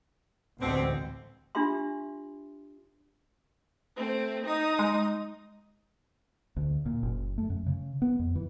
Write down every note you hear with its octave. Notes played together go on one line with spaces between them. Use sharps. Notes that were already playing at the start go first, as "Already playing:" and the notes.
A1 D2 B2 D3 G#3 C4
D4 F4 G4 E5 C6
A3 C4
D#4 D#5 D#6
G#3
D2
A#2
F#1
A3
F#2
C#3
B3
F2
E3